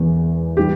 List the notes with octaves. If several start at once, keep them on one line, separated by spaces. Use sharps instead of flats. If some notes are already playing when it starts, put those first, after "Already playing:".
Already playing: E1 E2 E3
E3 G3 G4